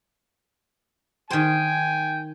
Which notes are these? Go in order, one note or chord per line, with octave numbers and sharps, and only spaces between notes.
D#3 C5 G5 G#5